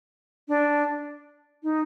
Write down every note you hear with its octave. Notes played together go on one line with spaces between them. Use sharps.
D4
D#4